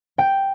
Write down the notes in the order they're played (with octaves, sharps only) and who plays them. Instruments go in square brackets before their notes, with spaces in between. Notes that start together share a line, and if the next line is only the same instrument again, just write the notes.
[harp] G5